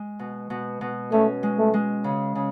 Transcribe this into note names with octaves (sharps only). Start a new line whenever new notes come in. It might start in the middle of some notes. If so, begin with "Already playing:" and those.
Already playing: G#3
B2
B2
B2
A3 C#4
G#3
A3
G#3
C#3
C#3